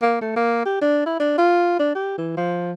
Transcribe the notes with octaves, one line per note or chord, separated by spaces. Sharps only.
A#3
A3
A#3
G4
D4
E4
D4
F4
D4
G4
E3
F3